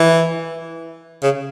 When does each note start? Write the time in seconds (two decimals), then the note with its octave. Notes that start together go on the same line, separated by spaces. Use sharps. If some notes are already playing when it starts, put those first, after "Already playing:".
Already playing: E3
1.23 C#3